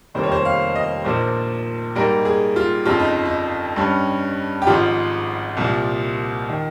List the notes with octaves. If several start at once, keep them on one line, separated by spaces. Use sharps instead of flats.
F1 F2 D#3 G3 A#3 C5
C#5
C5
F5
D#5
A#1 A#2 F3 A#3 D#4 C5
G#2 G3 A#3 D#4 A#4
G#4
F4
G1 F2 C#3 F4
D#4
D#4
G2 G3 C#4
G4
G#1 G#2 F3 F4
C2 A#2 F3
D#3